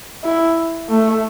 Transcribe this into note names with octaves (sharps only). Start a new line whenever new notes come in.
E4
A3